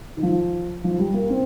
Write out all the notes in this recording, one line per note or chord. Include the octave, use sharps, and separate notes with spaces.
D#3
F3
F3
G3
A#3
C4